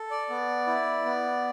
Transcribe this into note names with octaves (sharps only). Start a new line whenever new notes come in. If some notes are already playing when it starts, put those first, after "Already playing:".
Already playing: A4
D5
B3
E4
B3